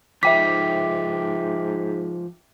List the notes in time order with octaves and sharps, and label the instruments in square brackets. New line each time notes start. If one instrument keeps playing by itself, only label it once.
[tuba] G#2 [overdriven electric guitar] F3 D#4 [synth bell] E5 G5 D6 [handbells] B6